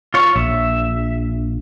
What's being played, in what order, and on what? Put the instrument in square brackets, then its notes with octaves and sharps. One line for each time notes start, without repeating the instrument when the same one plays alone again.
[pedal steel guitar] F4 C#5
[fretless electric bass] A#1 [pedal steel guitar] E5